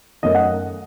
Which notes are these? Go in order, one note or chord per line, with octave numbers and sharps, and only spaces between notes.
F#2 D#3 A3 D#5
F#5